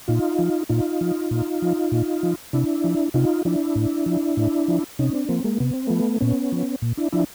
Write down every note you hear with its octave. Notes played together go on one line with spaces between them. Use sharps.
A#2 D#4 F4
F3
A#2 D#4 F4
F3
A#2
F3
A#2
F3
C3 D4 E4
F3
C3 D#4 F4
F3 D4 E4
A2
F3
A2
F3
C3 C#4 D#4
C4 D4
F3 A#3 C4
G#3 A#3
C3 B3
C4
F3 A3 B3
A#2 B3 C#4
F3
A#2
D4 E4
F3 D4 E4